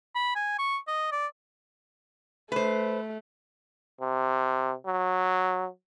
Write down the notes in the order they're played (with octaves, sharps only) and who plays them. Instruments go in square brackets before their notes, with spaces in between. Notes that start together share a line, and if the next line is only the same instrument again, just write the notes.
[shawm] B5
G#5
C#6
D#5
D5
[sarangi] A3 [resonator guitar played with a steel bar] B4 C5
[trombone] C3
F#3